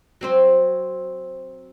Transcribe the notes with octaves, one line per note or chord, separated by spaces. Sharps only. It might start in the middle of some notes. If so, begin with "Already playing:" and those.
F#3 C4 C5